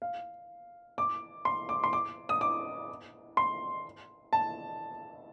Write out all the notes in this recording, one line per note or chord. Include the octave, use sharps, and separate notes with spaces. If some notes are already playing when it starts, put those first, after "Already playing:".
F5
D6
C6
D6
C6
D6
D#6
D6
C6
A5